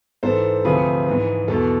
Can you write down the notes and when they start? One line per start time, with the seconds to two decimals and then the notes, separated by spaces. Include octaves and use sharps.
0.23 G#2 E3 A4 C5
0.65 D2 C3 F3 G#4 B4
1.07 G#2 E3
1.48 E2 B2 A4